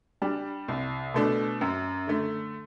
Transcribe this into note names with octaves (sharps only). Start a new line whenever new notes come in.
G3 D4
C2
B2 A3 D4
F#2
D3 A3